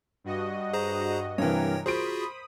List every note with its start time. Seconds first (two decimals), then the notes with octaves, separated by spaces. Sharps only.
0.24 G2 F#4 D#5
0.73 G#4 C5 A#5
1.38 G2 C3 E3 A#4 C#5 G5
1.86 F4 F#4 G#4 C5 B5 D#6 D7